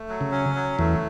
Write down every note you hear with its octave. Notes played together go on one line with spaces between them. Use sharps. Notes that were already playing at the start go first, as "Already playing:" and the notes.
Already playing: A3
F#3
C#3
C#4
F#3
E2 E3 A3